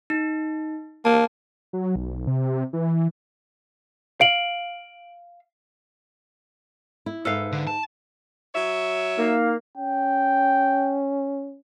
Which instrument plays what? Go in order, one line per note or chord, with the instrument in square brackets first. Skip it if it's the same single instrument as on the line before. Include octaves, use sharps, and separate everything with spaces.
[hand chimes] D#4
[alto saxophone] A#3 [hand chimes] A5
[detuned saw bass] F#3
B1
C3
E3
[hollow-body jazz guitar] F5 [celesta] D7 F#7
[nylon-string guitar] E4
[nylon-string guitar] G#2 E5 [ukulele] A4 B4 F5
[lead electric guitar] D3
A5
[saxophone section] F#3 C#5 E5
[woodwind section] A#3 D#4 F5
[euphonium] C#4 [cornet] G5